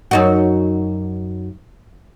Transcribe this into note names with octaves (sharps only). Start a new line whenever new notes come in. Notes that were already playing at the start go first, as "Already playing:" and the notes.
F#2 D#4 F#4